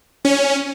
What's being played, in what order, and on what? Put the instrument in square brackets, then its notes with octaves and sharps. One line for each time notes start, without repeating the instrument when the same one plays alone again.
[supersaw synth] C#4